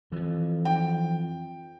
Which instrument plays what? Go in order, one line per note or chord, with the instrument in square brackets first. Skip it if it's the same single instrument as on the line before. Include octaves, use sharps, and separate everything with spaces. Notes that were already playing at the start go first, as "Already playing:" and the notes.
[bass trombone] F2 [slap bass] E3 F3
[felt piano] G5